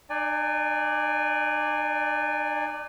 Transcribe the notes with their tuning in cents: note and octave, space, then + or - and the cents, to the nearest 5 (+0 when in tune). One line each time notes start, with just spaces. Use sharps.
D#4 -45 D5 +0 G#5 -20